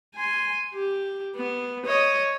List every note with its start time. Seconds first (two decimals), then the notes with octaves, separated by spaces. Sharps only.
0.15 G#5 C6
0.73 G4
1.36 B3
1.85 C#5 D#5